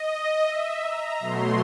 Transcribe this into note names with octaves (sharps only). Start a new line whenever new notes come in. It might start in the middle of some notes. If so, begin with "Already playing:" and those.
Already playing: D#5
E5
A#5
B2 F#3 A3 C6